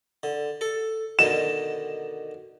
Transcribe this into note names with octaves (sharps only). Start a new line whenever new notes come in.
D3
A4
B2 D3 D#3 E7